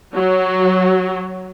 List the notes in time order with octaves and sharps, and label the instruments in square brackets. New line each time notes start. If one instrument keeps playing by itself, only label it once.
[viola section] F#3